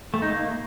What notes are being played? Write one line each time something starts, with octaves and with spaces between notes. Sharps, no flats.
A3
D#4
A#3